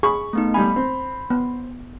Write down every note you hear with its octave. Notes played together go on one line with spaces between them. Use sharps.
G#4 B5 C#6
A3 B3 D#4
G3 D#4 G#5 B5
C4
B3